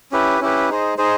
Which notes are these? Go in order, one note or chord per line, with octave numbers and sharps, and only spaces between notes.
C#4 E4 G4 B4
C#4 E4 G4 B4
D#4 G#4 C5 D#5
D#4 G#4 C5 D#5